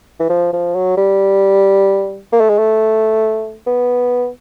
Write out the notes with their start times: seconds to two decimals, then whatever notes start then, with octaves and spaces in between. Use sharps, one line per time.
0.20 E3
0.29 F3
0.53 F3
0.75 F#3
0.98 G3
2.32 A#3
2.40 A3
2.49 G#3
2.58 A3
3.67 B3